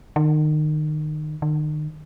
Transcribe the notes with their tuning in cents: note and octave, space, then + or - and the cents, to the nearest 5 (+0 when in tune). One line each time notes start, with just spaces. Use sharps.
D#3 -30
D#3 -40